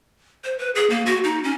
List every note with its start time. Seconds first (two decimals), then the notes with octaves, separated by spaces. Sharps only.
0.44 C5
0.58 B4
0.75 G#4
0.90 A#3
1.06 F#4
1.24 D#4
1.43 C#4